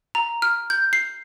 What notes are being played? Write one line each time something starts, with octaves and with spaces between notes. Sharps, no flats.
A#5
F6
G6
C7